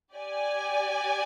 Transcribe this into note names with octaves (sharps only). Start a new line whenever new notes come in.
G4 D5 G#5